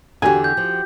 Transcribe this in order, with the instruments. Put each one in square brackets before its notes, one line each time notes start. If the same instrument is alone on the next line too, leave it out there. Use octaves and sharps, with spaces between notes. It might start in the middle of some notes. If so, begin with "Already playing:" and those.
[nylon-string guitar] E2 D3 [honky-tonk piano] F#4 G4 [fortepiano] G#5
[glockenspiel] G6
[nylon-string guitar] F3